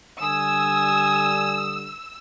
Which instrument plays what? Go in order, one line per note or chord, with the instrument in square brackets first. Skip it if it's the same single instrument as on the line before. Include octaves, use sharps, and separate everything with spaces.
[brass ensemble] D3 G3 [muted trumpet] G#5 [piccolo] D#6 [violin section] E6